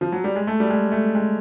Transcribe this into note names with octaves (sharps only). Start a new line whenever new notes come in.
F3
F#3
G3
G#3
A3
G3
G#3
A3
G#3